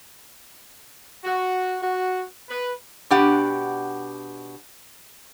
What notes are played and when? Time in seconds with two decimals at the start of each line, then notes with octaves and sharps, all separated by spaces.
1.25 F#4
1.81 F#4
2.49 B4
3.11 B2 D4 G4 F#5